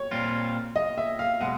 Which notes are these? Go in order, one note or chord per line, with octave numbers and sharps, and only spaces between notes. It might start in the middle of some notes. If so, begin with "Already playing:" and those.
Already playing: C#5
A#2 G3 C4 F4
D#5
E5
F5
B2 G#3 F#5